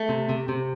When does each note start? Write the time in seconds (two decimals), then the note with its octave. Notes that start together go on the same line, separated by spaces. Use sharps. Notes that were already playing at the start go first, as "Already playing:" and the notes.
Already playing: A3
0.09 C3
0.29 C3
0.49 C3